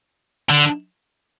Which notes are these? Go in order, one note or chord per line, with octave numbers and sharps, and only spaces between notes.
D3